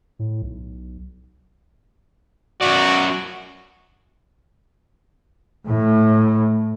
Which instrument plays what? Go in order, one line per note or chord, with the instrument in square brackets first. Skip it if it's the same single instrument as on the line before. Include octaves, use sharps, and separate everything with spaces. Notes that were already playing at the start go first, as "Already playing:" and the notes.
[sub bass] A2
B1
[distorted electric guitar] F#2 D5 [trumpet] F#4
[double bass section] A2